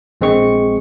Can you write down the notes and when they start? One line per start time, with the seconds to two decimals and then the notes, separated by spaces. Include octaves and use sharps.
0.21 A#1 G#3 C4 G#4 C#6 C#7